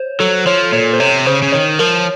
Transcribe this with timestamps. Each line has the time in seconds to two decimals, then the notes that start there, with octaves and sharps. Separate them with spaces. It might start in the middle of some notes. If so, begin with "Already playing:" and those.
Already playing: C5 C#5
0.20 F#3 A4
0.46 F3 C#5
0.73 A#2 C#5
0.93 C5
1.00 C3 C#5
1.26 C#3 C5
1.42 C#3
1.52 D#3 C#5
1.79 F3 A#4